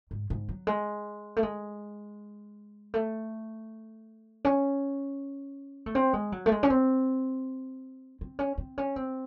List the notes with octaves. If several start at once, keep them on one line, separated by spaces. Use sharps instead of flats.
G#2
G#2
F#3
G#3
A3
G#3
A3
C#4
A3
C4
G#3
F#3
A3
G#3
C#4
C4
C4
C#4
C4
C#4
C4